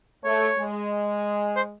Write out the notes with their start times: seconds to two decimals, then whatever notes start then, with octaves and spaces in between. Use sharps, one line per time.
0.24 A3 C#5
0.58 G#3
1.56 C5